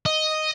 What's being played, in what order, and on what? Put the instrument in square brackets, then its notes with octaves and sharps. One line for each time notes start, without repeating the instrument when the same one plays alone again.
[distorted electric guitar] D#5